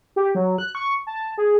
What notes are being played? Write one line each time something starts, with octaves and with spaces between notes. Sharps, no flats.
G4
F#3
F#6
C#6
A5
G#4